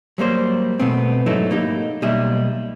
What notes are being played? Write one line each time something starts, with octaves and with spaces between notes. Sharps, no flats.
F#3 G3 A#3 C5
B2 A3 B3 C4
G#2 F#3 A3 D#4 E4
A#3 D#4 G4
B1 G3 A#3 D#5 E5